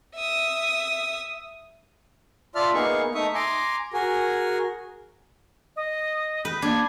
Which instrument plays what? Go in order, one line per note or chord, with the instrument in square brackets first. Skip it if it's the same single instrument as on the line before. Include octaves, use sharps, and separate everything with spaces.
[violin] E5 D#6
[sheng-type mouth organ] F4 D5 E5 A5 F6
A#3 B3 D#4 G#4 F5 C#6
A3 D#4 E5 C#6 D#6
G#5 A#5 C6 D6
F#4 G#4 A#4 G#5
[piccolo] D#5
[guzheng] B4 [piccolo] G6
[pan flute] A#3 [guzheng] D4 [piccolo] G#6